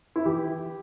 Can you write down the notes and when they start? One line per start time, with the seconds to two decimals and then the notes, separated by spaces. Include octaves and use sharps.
0.16 E4
0.26 E3 G4